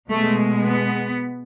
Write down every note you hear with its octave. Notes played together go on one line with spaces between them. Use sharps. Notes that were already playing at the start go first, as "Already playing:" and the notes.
B2 G#3 A3
B3